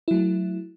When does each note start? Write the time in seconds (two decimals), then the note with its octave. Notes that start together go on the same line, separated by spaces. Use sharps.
0.08 E4
0.11 F#3
0.14 A3